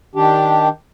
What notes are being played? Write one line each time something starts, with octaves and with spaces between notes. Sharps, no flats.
D#3 D4 G4